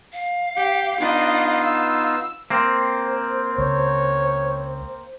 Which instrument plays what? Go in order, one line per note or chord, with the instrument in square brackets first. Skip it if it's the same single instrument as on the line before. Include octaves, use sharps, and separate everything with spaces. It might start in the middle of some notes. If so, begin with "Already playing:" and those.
[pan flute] F5
[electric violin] G4
[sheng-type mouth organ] B3 D#4 F4 [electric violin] D4 D#5
[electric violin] E6
[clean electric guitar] A#3 C4 [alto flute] C5
[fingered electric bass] C#2 [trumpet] C#5